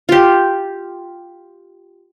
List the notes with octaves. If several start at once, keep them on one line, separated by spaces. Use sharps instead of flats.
F4 G4